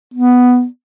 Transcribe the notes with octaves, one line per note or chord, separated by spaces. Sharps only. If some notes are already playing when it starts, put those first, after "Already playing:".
B3